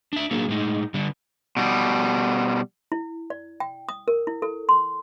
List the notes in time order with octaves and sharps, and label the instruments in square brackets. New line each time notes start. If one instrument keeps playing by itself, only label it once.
[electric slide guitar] D4 E5
F#3 A#3 D4 G#4
A2 G#3 D#4
D3 G3 D4
B2 G3
[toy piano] E4
D5
G5
D#6
A#4
E4
A4
C6